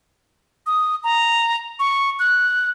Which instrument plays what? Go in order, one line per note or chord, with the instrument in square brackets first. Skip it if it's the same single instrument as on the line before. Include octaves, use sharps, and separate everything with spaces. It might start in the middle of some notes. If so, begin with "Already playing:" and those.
[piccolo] D#6
A#5
C#6
F#6